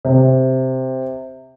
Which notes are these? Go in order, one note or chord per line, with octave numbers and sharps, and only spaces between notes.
C3